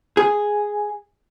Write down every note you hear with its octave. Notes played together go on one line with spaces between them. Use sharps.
G#4